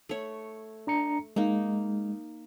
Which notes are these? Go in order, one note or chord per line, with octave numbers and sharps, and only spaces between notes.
A3 C#5
D4 A#5 C#7
G#3 A#3 D#4